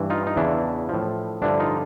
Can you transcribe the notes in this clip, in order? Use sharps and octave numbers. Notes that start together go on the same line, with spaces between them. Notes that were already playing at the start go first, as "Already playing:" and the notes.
Already playing: G2 E3
D#4 F4
D#4
E2 C#3 E3 D4 E4
A2 F3
G2 D3 F3 D4 E4
D#4 F4